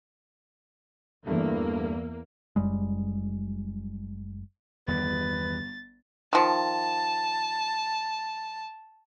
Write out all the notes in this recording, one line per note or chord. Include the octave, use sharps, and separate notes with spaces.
E2 G2 D3 A3 A#3
F#1 F#2 G3 G#3
G1 E2 D#3 G3 B4 A6
D#3 F3 A5